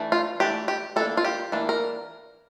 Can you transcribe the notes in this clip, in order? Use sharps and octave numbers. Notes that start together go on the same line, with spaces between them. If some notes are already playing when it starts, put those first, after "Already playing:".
Already playing: E3 A3 D4
F4
E3 A3 D4 G4
G4
E3 A#3 D4 A4
F4
G4
E3 A#3 D4
A#4